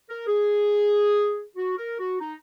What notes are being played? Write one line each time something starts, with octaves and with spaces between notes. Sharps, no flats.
A#4
G#4
F#4
A#4
F#4
D#4